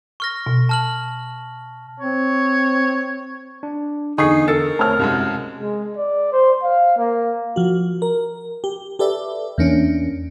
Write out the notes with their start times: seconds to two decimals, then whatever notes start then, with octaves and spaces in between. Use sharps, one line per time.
0.20 C#6 F6 A#6
0.46 B2
0.69 A5 F6 F#7
2.00 C4 C#5
3.63 D4
4.18 E2 D3 D#4 G#4 C#6 C7
4.48 A4 A#4 E6 A6 C#7
4.79 A3 C4 C#5 A5 F6
4.99 C2 F#2 C3 G#3
5.58 G#3
5.97 D5
6.32 C5
6.63 F5
6.98 A#3
7.56 F3 F#4
8.02 A#4
8.64 G4
8.99 G4 A4 B4 D5 E5
9.58 E2 A#3 C#4 D4